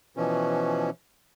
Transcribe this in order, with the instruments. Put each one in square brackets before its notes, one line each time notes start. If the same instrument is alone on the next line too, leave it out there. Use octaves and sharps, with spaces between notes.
[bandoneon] B2 E3 F3 C#4